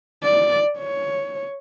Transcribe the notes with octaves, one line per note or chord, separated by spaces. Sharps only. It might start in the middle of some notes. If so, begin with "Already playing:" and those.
D5
C#5